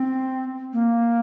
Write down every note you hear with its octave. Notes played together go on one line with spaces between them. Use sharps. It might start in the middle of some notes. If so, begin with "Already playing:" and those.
Already playing: C4
A#3